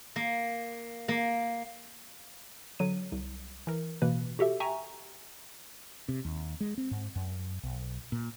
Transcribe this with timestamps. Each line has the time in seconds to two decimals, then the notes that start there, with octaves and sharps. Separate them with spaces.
0.16 A#3
1.08 A#3
2.79 D3 F#3 D#7
3.12 C2
3.67 E3 A#4
4.02 A1 B2 E3 A#3 B4
4.39 F#4 G4 A4 E5
4.60 E5 G5 G#5 A#5 C#6
6.08 C3
6.25 D#2
6.60 G#3
6.78 C4
6.91 G#2
7.15 F#2
7.63 B1
8.12 A#2